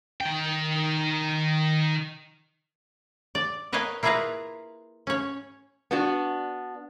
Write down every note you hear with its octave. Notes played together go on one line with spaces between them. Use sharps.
D#3 G5
D5
A#4 B4 C#5 D#5 F5 G#5
A#3 E4 F4 G#4 B4 A#5
C#4 C#5
B3 D4 F#4